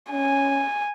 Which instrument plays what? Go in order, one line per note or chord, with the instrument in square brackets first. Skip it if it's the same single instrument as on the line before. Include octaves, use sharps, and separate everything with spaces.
[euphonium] C#4 [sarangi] G#5